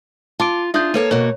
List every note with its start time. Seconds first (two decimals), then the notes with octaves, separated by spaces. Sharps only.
0.40 F4 A5 D6 D7
0.74 D4 F4 G#4 E5 D#6 G6
0.94 A#3 A4 B4 C#5 A5 D#7
1.11 B2 A#3 F#4 C#5